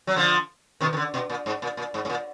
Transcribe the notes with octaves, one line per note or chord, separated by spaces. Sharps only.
F#3
D3 F3
B2 D#3
D#3
D3
B2
A#2
G#2
A#2
A#2
G#2
G#2
A#2